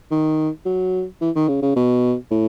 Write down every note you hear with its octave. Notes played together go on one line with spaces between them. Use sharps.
D#3
F#3
E3
D#3
C#3
C#3
B2
A2